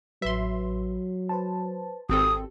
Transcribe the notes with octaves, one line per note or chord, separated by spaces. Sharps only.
A1 F#3 B4 E5 C6
B4 C5 A5
G#1 C4 G4 A4 D#6